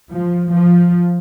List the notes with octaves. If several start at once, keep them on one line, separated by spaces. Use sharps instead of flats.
F3
F3